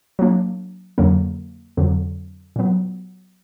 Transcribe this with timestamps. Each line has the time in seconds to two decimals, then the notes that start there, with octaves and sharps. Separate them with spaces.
0.19 F#3 A#3 D4
0.98 F2 D3 F#3 A#3
1.77 F2 D3 F#3
2.56 A#2 F#3 B3